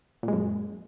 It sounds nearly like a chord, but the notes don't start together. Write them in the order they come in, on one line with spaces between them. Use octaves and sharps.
A#2 G#3 F#2